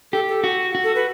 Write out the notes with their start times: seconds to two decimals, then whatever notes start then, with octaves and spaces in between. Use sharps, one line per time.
0.12 G4 A4
0.28 A4
0.44 F#4
0.75 F#4
0.84 A4
0.95 B4